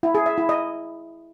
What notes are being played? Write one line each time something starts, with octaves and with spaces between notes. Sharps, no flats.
E4
G#4
E5
E4
D#5